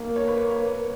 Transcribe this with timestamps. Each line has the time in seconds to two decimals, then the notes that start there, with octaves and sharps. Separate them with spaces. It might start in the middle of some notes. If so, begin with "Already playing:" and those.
Already playing: A#3
0.16 C#5
0.27 B4
0.37 C#5